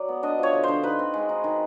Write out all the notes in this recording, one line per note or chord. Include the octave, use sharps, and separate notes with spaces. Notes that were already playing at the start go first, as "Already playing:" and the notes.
Already playing: F#3 D5
B3
D4 D#5
F3 C#5
D3
D3 C5
D#4 B4
C4
G#3
D#4
D#3